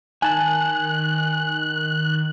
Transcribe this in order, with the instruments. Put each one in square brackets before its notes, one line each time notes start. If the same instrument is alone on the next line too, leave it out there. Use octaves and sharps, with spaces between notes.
[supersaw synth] D#3 [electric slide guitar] G#5 A5 [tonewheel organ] F#6